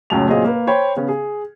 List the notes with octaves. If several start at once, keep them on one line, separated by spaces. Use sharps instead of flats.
C#2 F#2 A2 C#3 A5 F7
F#2 A#2 C4 G#4 D#5 D#6
A#3 B4
C5 C#5 G5 B5
C#3 B3 C#4
G#4